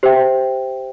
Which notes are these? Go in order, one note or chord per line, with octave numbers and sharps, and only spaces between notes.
G4 C5 E5 G5